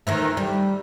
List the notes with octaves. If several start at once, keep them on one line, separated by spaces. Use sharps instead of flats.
D#3 E3 A3
G3